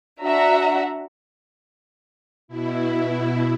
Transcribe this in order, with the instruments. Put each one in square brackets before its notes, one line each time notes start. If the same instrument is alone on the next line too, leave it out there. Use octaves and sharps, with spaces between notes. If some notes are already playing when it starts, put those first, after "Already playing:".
[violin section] D4 F#4 E5 F#5 A#5
[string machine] B2 E4